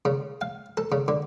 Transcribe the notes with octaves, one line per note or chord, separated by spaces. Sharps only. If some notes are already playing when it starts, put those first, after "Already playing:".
C#3
F5
A4
C#3
D3